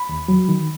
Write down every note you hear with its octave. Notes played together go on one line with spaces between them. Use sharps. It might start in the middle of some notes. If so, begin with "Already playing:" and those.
Already playing: B5
D#2
F#3
D#3